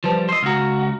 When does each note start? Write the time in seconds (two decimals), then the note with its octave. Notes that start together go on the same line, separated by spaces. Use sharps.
0.04 F3 G3 B4 C5 A5
0.29 C5 D#5 E6 C7
0.43 C#2 F#4 A#5 F6